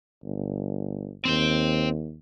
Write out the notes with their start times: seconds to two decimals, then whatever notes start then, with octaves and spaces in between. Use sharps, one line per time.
0.24 G1
1.25 D#2 C4 C5